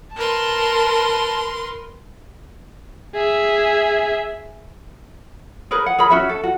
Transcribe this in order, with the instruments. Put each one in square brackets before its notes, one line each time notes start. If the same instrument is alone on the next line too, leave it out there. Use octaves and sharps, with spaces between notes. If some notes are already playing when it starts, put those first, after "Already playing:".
[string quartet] A#4 B4 C6 [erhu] A5
[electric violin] G#4 E5
[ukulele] G#4 A#4 B4
F#5
G#4 A#4 B5
C#4 F#4 E5
A4
F#4